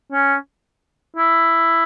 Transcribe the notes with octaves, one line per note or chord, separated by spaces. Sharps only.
C#4
E4